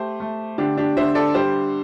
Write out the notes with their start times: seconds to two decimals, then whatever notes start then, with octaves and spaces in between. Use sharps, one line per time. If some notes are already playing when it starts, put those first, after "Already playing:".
Already playing: A3 G4 C5
0.20 A3
0.58 D3 D4 G4
0.78 D4 G4
0.97 D3 C5 E5
1.15 A4 D5
1.34 G3 G4 C5